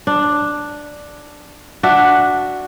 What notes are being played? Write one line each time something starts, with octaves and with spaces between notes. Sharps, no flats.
D4
D4 F#4 E5